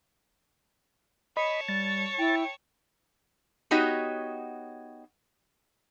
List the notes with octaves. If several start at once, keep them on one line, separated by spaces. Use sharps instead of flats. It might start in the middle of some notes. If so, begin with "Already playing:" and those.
C#5 D#5 A5 B5
G3 A6
E4 G5
B3 D#4 F#4 G4 C#5 D#5